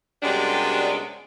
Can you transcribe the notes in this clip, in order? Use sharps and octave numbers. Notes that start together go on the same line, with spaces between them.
F#2 C3 G3 G#3 B3 D4